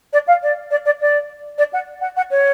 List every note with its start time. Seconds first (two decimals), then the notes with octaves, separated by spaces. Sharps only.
0.13 D5
0.27 F5
0.42 D5
0.71 D5
0.85 D5
1.00 D5
1.58 D5
1.73 F#5
2.01 F#5
2.16 F#5
2.31 C#5